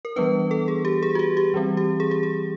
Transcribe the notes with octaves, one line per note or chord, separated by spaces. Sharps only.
A#4
E3 G3 B3 D4 B4
A4
G#4
G4
G#4
F#4
G4
G4
E3 G3 C4
G4
G#4
G4
G#4